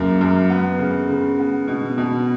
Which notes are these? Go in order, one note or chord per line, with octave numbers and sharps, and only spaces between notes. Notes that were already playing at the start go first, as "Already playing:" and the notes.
Already playing: F#2 C#3 A#3
F#2
B3
C#3
C#3
B3
B2
B2